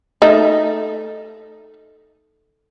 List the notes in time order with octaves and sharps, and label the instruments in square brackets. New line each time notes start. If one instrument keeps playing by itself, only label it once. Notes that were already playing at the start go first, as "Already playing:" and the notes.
[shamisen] A3 D#4